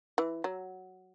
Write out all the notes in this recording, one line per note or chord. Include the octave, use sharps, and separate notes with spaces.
E3
F#3